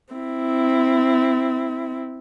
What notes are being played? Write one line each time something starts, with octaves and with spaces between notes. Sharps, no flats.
C4 E4